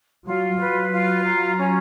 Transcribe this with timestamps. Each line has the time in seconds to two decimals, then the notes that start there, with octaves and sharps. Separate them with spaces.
0.25 F#3 F4
0.58 F#3 B4
0.91 F4
1.24 A#5
1.58 C#4